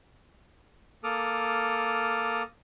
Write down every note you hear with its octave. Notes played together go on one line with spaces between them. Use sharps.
A#3 A4 D6 D#6 F6